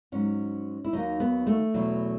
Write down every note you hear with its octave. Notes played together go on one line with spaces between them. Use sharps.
G#2 F#3 C#4
E4
D#2 D#3 F#3 D#4
B3
A3
E2 B2 F#3